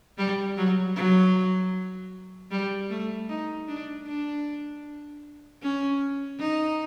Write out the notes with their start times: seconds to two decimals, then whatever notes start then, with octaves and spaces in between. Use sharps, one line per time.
0.18 G3
0.57 F#3
0.96 F#3
2.51 G3
2.90 A3
3.29 D#4
3.68 D4
4.07 D4
5.62 C#4
6.40 D#4